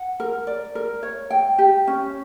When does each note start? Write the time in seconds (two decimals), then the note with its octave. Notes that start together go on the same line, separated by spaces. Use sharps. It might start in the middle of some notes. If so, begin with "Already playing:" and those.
Already playing: F#5
0.20 A#4
0.47 D5
0.75 A#4
1.03 C#5
1.31 G5
1.58 G4
1.87 C#4